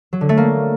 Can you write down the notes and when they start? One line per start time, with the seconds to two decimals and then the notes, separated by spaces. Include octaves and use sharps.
0.13 F#3
0.21 D3
0.29 A3
0.37 A#3